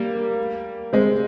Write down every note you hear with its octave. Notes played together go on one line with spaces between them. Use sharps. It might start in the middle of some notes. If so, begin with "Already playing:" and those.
Already playing: G3 A#3
G#3 C4